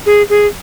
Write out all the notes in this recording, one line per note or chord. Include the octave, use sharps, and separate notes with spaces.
G#4
G#4